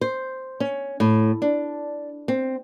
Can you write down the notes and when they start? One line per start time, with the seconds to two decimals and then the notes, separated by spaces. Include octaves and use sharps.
0.01 C5
0.60 C#4
1.00 A2
1.42 D4
2.28 C4